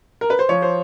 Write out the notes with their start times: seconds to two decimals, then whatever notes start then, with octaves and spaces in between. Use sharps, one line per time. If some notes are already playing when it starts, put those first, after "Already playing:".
0.21 A#4
0.30 B4
0.39 C5
0.49 F3 C#5
0.62 C5